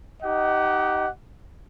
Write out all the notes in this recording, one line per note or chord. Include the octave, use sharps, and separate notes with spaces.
D#4 G4 D#5 F#5